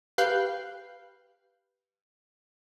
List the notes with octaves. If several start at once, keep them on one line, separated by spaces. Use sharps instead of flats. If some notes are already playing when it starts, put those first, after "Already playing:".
G4 B4 F5 F#6 G6 C7